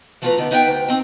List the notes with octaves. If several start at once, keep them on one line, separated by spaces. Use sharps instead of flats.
E3 A3 B3 F4 A#4 B4
D3 B3 D#4
B3 D#4 B4 E5 F#5 G5
D2
C4 D#4